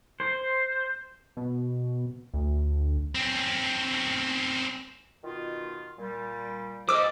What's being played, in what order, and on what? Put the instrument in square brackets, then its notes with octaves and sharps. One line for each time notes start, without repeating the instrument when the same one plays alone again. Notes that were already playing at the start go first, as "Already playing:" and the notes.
[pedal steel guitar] C5
[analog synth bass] B2
D2
[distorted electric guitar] C4 C#4
[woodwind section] B2 D#3 F4
A#2 G3
[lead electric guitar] C5 D#5 [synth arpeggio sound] D6 E6